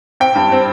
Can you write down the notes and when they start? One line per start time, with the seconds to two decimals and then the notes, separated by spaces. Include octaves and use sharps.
0.20 C4 G5
0.36 G2
0.52 C4